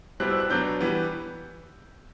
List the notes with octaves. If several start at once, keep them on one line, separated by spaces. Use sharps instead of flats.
B2 G3 C4 E4 F#6
E6
F#6
B2 F#3 B3 D4 G6
E3 G3 B3